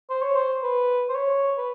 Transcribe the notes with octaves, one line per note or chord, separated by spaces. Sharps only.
C5
C#5
C5
B4
C5
C#5
B4